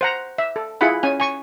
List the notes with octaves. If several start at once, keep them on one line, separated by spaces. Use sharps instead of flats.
C5 F#5 A#5
E5
A4
E4 F4 G#4 F#5 B5
C#4 G#5
G#5 C#6